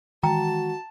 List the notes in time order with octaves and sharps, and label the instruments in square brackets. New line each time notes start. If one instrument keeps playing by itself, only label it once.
[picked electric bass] D#3 E3 G#3 [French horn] F#4 [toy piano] G5 A#5 [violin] A5